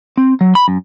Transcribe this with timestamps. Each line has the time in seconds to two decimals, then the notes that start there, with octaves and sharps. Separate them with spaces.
0.17 C4
0.41 F#3
0.55 B5
0.68 F#2